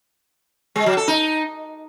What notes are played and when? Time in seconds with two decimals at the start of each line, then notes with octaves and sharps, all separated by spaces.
0.76 G#3
0.86 F#3
0.97 A4
1.08 D#4